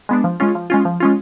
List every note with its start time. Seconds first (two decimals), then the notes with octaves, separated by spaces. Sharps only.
0.09 G#3 B3 D4
0.24 F3
0.40 G#3 C#4 F4
0.55 F3
0.70 G#3 C#4 F4
0.85 F3
1.00 G#3 C#4 F4